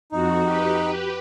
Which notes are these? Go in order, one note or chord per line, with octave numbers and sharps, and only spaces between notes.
F2 D#4 F#4
G4 B4